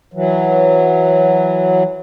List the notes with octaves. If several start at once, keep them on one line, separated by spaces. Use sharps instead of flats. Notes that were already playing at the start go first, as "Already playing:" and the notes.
E3 F#3